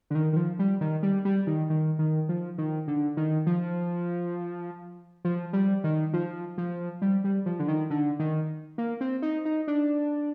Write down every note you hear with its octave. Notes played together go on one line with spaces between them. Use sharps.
D3
D#3
D#3
F3
G3
D#3
G3
G3
D#3
D#3
D#3
F3
D#3
D3
D#3
F3
F3
G3
D#3
F3
F3
G3
G3
F3
D3
D#3
D3
D#3
A#3
C4
D#4
D#4
D4